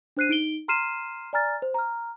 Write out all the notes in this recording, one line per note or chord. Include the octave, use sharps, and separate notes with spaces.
D4 C5 F#6 C7 D#7
D#4 D7 G7
A#5 C6 F6 C7 D#7 E7
D5 G#5 A#5 F6 A6
C5
A#5 F6